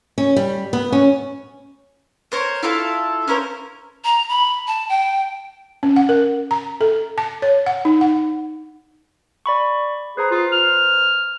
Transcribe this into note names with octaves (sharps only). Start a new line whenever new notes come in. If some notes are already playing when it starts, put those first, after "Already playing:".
C#4
G3
B3
C#4
A#4 C5 C#5
E4 F4 A4 F5
C#4 E4 A#4 C5
A#5
B5
A5
G5
C#4
F#5
A#4
A#5
A4
A5
C#5
F#5
D#4
F#5
D5 B5 C#6
G#4 B4 C5 A#5
F4
F6